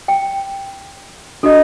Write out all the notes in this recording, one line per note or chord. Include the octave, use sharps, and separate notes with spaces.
G5
D4 F#4 A4 D#5